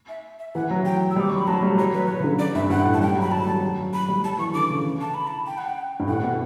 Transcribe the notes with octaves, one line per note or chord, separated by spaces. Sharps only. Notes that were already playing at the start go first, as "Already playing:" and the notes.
E5
E5
E3 F#5
F#3
G5
E6
G3
D6
F#3 C#6
B5
F#3 A5
G3
F#3 C#5
B4
F#3 C#5
C#3 B4
D3
D5
G2 E5
G2 F#5
A2
A5
G3 G5
F#3
B5
F#3 A5
F#3
G3
F#3
F#3
F#3 B5
G3
F#3 A5
E3 C#6
D3 D6
C#3
A5
B5
A5
G5
F#5
G5
G2
A2 F#5
B2